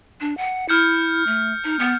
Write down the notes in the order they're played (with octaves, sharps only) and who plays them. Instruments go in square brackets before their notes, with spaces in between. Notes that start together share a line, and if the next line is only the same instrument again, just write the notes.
[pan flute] D4
F#5
[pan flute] E4 [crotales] F6 G6 C#7
[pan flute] A3
D#4
B3